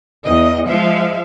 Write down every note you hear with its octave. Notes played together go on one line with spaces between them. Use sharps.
E2 D#5
F3 G#3 E5 F5